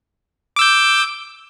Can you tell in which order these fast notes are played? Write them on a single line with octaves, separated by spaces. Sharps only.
D6 E6 G6